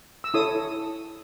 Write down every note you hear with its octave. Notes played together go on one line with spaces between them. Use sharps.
E6
E4 A4 C#5 D#6